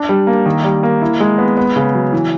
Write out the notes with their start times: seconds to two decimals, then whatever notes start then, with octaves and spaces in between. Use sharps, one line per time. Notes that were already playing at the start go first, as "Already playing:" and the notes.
Already playing: D4
0.09 G3
0.27 A#3
0.46 D#3
0.64 G3
0.83 A#3
1.02 E4
1.20 G#3
1.38 B3
1.57 B3
1.76 C#3
1.94 F#3
2.13 E3